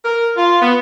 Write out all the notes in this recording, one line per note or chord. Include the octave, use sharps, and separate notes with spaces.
A#4
F4
B3